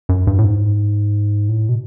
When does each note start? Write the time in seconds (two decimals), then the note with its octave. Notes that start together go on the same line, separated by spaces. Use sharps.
0.09 F#2
0.27 G2
0.39 A2
0.44 G#2
1.49 A2
1.69 B2